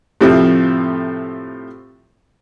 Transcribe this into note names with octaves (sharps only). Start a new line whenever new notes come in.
A2 C3 F3 A3 C4